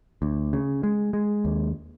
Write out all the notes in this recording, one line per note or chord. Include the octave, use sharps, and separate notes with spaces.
D2
C#3
G#3
G#3
D#2